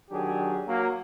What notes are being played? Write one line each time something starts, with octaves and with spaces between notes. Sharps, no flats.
D#3 F#3 D4 G4 G#4
F#3 A#3